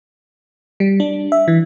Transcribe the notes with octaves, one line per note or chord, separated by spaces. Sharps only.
G3
D4
E5
E3